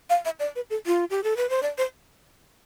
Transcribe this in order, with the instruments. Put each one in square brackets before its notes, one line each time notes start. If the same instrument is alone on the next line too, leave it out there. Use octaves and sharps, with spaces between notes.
[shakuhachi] F5
E5
D5
B4
A4
F4
G4
A4
B4
C5
D5
C5